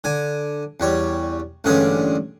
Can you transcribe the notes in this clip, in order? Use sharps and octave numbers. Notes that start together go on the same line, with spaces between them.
D3 G#5
E2 G3 C#5
A1 G2 D3 G#3 C#4 G#4